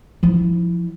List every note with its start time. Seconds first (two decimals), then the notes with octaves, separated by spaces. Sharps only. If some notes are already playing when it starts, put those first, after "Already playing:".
0.23 F3 E4